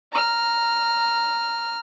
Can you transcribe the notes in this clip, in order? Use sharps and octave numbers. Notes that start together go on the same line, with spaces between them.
A#5 F6